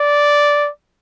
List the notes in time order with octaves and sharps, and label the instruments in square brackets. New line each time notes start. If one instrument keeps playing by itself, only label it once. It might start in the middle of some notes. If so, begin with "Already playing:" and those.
Already playing: [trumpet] D5